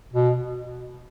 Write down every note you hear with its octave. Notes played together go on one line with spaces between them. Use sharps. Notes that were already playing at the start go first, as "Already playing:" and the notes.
B2